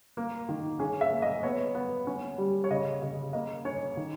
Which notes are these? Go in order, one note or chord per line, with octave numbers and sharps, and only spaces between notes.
A#3
D#3
C#4 G#4
E5
A#3
D#5
B3 C#5
B3
C#4
G3
C#5
C#3 D#5
C#3 D#5
A#3 D#5
C#4 C#5
D#3